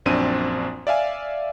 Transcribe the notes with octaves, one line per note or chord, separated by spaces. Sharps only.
A#1 F#2 C4 D4 D#7
D5 E5 F5 G#5